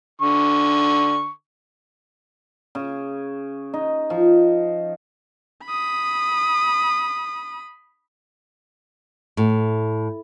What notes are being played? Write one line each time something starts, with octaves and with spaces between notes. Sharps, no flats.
D3 C#6
C#3
D#4
F3
B5 D#6
A2